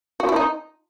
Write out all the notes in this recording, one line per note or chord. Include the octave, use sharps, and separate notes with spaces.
F#4
E4
D#4